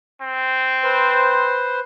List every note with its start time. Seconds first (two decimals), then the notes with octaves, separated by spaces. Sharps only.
0.21 C4
0.84 B4 C5 C6